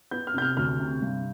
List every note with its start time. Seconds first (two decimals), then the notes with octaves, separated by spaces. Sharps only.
0.11 B3 G6
0.27 F6
0.34 C3 G6
0.42 F6
0.57 D2 F6
0.80 C3
1.02 G2